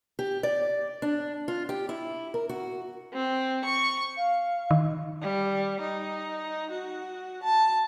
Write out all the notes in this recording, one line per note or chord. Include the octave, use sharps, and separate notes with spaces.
G4
D5
D4
F4
G4
E4
A#4
F#4
C4
C#6
F5
D#3
G3
D#4
F#4
A5